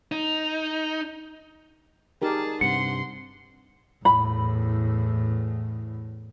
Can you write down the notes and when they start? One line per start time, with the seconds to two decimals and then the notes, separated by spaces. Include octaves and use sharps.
0.12 D#4
2.22 D#4 G4 G#4 A#4 A5
2.61 G2 C3 F#5 C6 C#7
4.05 E2 A2 B5